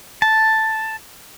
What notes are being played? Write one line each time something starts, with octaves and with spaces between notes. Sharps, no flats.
A5